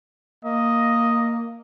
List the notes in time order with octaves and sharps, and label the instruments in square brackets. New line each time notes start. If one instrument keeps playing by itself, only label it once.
[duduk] A#3 [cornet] D#5